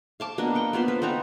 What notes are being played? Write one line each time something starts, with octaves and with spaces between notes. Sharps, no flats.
F5 A5 D6
A#3 B3 D4 D#5
F#5 G5
B3 F4 B4 C5
B4
B3 C4 D#4 A#5